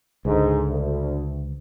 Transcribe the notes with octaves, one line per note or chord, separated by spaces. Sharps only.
C#2 G#2 D3
D2